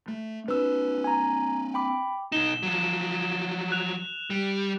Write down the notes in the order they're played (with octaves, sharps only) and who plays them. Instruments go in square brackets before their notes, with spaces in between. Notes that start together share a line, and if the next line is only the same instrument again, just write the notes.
[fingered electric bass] A3
[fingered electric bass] C4 D4 [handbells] B4 E6
[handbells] G#5 A#5
G5 B5 D6
[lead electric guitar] B2 D#4 [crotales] E7 G7
[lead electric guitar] F3 F#3
[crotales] F#6 F7
[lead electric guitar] G3